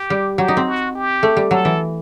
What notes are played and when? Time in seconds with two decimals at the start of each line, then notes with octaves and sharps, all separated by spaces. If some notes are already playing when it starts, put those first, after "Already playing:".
Already playing: G4
0.10 G3
0.38 F#3 G4
0.48 D#4
0.57 C4
0.67 F#4
0.95 G4
1.23 A3
1.37 G3
1.51 F#3 A4
1.65 E3